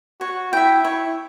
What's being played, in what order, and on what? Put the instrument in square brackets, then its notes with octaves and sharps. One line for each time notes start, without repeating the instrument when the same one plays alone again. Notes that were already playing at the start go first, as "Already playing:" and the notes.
[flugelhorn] F#4 [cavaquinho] C#5
[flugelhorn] E4 [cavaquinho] E5 G5
[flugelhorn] E4 [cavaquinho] C#5